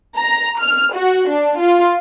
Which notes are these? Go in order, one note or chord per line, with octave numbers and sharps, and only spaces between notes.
A#5
F6
F#4
D4
F4